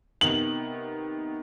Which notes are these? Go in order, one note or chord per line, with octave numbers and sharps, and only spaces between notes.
C3 D#3 B3 F#7